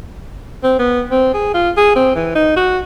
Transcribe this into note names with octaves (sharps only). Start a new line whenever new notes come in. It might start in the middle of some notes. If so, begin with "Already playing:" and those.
C4
B3
C4
G#4
F4
G#4
C4
E3
D#4
F#4